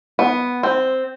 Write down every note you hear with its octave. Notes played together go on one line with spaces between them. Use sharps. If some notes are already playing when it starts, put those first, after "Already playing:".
B3
C4